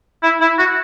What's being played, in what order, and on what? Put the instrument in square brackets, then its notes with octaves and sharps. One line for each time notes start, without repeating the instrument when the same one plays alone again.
[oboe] E4
E4
F#4